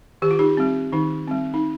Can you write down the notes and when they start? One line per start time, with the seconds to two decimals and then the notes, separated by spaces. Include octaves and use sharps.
0.22 D#3 G4
0.31 F4
0.39 D#4 G4
0.57 G3 C4
0.92 D#3 D#4
1.27 G3 C4
1.54 D#4